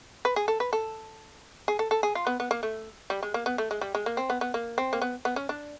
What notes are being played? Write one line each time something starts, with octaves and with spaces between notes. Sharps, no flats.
B4
G#4
A4
B4
A4
G#4
A4
A4
G#4
F4
B3
B3
A#3
A3
G3
G#3
A#3
B3
A3
G#3
G3
G#3
A#3
C4
B3
B3
A#3
C4
A#3
B3
B3
C#4
D4